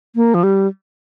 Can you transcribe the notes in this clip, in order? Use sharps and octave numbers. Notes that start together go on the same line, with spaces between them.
A#3
F3
G3